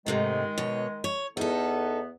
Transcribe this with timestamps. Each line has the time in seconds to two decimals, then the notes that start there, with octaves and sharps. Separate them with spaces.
0.06 G#2 C3 D#3 G#3 A3
0.58 B2 C#5
1.04 C#5
1.37 E2 B3 D#4 A4